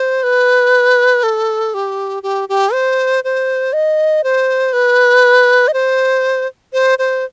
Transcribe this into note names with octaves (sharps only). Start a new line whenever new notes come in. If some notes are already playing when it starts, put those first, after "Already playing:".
Already playing: C5
B4
A4
G4
G4
G4
C5
C5
D#5
C5
B4
D#5
C5
C5
C5